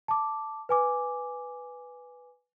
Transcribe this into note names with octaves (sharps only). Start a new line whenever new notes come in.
A5 D6
B4 G#5 D6